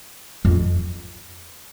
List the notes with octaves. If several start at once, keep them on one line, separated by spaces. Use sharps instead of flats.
F2